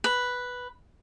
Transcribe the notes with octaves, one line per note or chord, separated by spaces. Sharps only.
B4